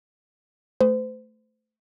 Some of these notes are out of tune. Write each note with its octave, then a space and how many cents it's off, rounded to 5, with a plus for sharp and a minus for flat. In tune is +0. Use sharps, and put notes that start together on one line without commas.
A3 +0 C5 -35